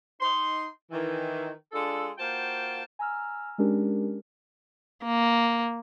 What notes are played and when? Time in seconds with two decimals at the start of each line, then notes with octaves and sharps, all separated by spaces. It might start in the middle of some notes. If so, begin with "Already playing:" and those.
0.21 D#4 C6
0.91 D#3 E3
1.72 G#3 D4 F4 A4
2.18 A#3 F4 F#4 C5 G5 A5
2.99 G#5 A#5 E6 F6
3.58 G#3 C#4 D4 G4 A#4
5.04 A#3